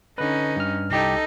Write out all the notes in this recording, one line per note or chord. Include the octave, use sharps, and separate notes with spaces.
D3 C#4 D#4 B4
G2 F6
C2 D#4 G4 A4 G5